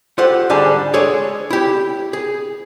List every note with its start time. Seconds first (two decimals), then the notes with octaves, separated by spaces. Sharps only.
0.18 F4 G4 A4 C5 F#5
0.50 G#2 D3 G3 D4 G#5 A5
0.94 G#3 G#4 A4 C#5 D5
1.50 E4 G4
2.13 G#4